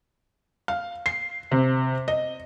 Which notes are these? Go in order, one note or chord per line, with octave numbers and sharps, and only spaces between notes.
F5
C7
C3
D#5